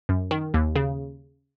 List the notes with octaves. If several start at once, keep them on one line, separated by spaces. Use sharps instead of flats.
F#2
D#3
D#2
C#3